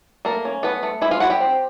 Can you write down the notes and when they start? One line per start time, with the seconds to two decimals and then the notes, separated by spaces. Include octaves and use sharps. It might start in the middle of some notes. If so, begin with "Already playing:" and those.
0.25 A3 A#3 A#4
0.45 C#4
0.63 A3 B3 B4
0.83 A3
1.01 G#3 E4 E5
1.11 F4 F5
1.20 E4 F#4 F#5
1.30 G4 G5
1.41 C4